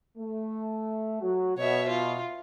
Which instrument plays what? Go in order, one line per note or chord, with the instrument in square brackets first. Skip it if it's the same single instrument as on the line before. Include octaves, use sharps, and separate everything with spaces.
[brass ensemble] A3
F#3 F#4
[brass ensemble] B2 [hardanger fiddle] C#5 E5
[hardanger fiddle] F4